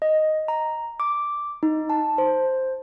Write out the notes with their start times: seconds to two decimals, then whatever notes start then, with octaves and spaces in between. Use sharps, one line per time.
0.02 D#5
0.48 A#5
1.00 D6
1.63 D#4
1.90 A5
2.18 C5